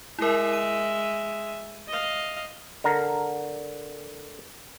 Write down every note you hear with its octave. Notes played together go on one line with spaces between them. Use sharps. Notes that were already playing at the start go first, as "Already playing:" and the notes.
G#3 E4 A#4 E5
D#7
D#5 F5
D3 A#4 A#5